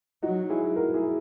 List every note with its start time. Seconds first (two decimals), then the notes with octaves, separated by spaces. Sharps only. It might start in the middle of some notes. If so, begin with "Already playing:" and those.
0.23 F#3 D#4 F#4
0.50 E4 G#4
0.76 F#4 A#4
0.94 E4 G#4